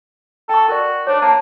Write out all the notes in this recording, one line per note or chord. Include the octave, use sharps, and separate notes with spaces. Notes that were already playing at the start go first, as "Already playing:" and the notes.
A4 G5 C#6
F#4 A#4 D5
D4 C5 C#5
A#3 A5 B5